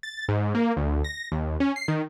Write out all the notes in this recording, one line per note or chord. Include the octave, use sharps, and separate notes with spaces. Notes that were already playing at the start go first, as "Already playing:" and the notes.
A6
G#2
A#3
D2
A#6
D#2
C#4
C7
D#3